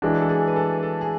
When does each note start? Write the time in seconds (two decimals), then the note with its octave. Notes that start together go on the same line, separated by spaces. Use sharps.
0.02 E3 G#3 D4 F#4
0.22 A4
0.29 G#4
0.47 B4
0.56 A4
0.83 A4
1.01 G#4